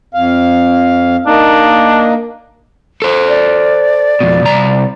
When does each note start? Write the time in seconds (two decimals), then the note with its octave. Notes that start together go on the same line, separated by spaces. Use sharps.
0.14 F2 F5
1.26 A#3 D4 D#4
3.02 A4 C5
3.28 D5
4.20 F2 B2
4.43 C2 A#5